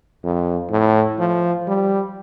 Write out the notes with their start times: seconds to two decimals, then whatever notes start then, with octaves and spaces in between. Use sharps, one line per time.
0.24 F2
0.71 A2
1.19 F3
1.68 G3